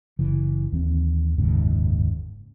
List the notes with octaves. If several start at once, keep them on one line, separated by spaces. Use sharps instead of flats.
F#1 C#3 E3
D#2 E3 C4
F#1 D#2 G#2 C#3